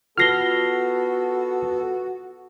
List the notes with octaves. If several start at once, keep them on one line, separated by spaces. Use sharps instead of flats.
B3 F4 F#4 A4 F6 A#6 C7 G7